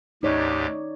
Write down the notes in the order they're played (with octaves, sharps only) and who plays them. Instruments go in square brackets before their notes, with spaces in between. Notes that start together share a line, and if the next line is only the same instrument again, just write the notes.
[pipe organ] D2 G#2 G4 [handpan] D#4 C#5 D5